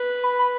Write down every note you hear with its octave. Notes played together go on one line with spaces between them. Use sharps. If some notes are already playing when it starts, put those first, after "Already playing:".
Already playing: B4
B5
B5